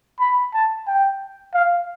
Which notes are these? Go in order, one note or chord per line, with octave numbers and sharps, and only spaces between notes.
B5
A5
G5
F5